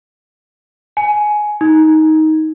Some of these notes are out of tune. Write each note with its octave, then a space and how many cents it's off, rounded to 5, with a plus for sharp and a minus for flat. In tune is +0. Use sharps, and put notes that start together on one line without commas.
G#5 +15
D#4 +15